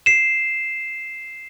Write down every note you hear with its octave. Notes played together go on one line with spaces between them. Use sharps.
C7 E7